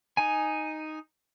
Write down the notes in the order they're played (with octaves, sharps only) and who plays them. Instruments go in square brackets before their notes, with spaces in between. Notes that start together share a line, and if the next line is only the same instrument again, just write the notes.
[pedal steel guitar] D#4 G#5